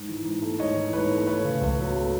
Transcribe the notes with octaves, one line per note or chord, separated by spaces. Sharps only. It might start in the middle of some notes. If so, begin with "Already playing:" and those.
Already playing: G#2
E3
G#2
A3
G#2 C#5 D#5
E3
G#2 B4 C#5
A3
A3 B4 C#5
C#3
C#2
F#3
A3